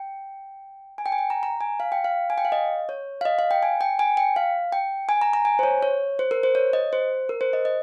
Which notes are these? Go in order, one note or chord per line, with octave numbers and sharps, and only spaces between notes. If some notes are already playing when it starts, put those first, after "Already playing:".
Already playing: G5
G#5
G5
G#5
G5
A#5
A#5
G#5
F5
G5
F5
G#5
G5
F5
D#5
C#5
F5
D#5
F5
G5
G#5
G5
G#5
G5
F5
G5
G#5
A#5
A#5
G#5
C5
C#5
C#5
C5
A#4
C5
C#5
D#5
C5
A#4
C5
D#5
D#5